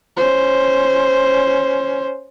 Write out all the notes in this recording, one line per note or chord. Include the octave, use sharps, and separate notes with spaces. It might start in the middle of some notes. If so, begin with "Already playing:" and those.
C#4 C5